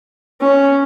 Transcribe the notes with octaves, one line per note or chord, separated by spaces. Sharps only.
C#4